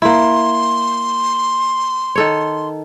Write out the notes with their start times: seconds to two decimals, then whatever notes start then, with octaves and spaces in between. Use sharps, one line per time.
0.02 A#3 E4 C6
2.15 D#3 A4 C#5